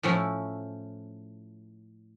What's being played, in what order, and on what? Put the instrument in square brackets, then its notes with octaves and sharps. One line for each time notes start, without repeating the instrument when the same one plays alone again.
[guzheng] A2 F3 C#4 E4